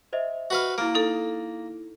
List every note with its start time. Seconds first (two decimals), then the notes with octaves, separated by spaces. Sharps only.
0.13 C5 D#5 E5
0.50 F#4 B4 F5
0.78 A#3 E4 D7
0.95 D#4 A4